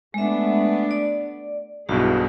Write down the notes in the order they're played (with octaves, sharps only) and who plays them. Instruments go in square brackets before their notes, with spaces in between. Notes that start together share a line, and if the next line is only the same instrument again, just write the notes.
[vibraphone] G#3 E5 [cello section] A3 B3 D4
[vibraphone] D5
[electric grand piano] B1 G2 B2 [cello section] E4 G#4 [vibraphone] F#4